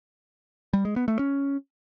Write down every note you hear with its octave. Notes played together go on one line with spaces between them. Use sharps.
G3
G#3
B3
A3
C#4